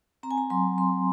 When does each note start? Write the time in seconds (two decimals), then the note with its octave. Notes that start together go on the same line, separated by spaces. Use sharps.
0.23 C4 A#5
0.31 G#5
0.38 A#5
0.50 F#3 C6
0.78 C4 C6